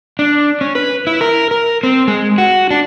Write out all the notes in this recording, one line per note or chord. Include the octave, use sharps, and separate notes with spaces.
D4
C#4
B4
E4
A#4
A#4
C4
G#3
F#4
D4